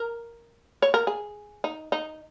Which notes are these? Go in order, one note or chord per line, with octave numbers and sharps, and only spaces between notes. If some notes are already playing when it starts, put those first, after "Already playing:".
Already playing: A#4
C#5
A#4
G#4
D#4
D#4